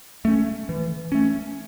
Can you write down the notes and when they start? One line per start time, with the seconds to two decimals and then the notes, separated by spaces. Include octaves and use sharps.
0.25 A3 C#4
0.69 E3
1.12 A3 C#4